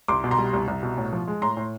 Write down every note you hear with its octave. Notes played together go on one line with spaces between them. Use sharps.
C2 C6 D6
B2
A#5 C6
G3
C2
C2
B2
A2
F3
G#3
A2 A#5 C6
A2